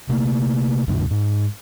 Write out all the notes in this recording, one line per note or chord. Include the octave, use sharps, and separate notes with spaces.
C3 A3 A#3
D2 G2 C3 D#3
G#2